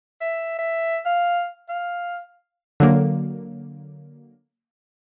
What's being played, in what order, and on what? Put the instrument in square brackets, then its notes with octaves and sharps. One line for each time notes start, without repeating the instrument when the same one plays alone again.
[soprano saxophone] E5
E5
F5
F5
[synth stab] D3 F#3 A#3